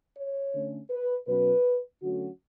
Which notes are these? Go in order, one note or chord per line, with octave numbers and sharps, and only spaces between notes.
C#5
D3 A3 C#4
B4
B2 F#3 C#4 B4
D3 F#3 A3 C#4 F#4